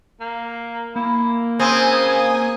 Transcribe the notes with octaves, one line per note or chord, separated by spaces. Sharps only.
A#3
A#3 E4
C#3 C4 G#5 D#6